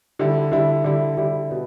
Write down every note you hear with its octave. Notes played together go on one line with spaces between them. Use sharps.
D3 G3 E4
D3 G3 E4
D3 G3 E4
D3 G3 E4
B2 G3 B3